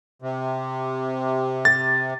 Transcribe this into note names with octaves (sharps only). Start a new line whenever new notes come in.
C3
A6